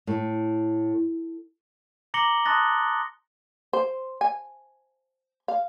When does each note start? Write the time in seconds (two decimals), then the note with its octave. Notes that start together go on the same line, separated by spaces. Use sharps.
0.07 A2
2.14 A#5 D6 A#6 C#7 F#7 G7
2.46 A5 C6 D#6 F#6 A6 A#6
3.73 C5
4.21 G#5
5.48 F5